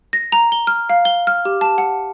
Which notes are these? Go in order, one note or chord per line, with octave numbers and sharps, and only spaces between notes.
A#6
A#5
G7
F6
F5
G7
F6
G4
A5
F#5